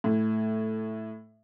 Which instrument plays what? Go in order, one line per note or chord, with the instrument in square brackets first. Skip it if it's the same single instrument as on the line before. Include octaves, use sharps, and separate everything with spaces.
[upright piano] A2